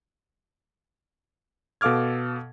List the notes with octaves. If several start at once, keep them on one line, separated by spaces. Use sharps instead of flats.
B2 A4 F5 D6 F6 G#6